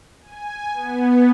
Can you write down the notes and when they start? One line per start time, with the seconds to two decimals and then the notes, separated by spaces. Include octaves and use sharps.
0.22 G#5
0.74 B3